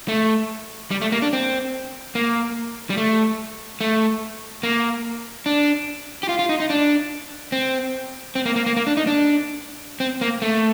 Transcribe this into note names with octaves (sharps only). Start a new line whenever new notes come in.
A3
G3
A3
A#3
D4
C4
A#3
G3
A3
A3
A#3
D4
G4
F4
F4
D#4
D#4
D4
C4
C4
A#3
A#3
A#3
A#3
D4
D#4
D4
C4
A#3
A3